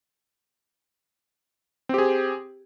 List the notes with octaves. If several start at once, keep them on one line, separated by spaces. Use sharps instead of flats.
C4 G4 G#4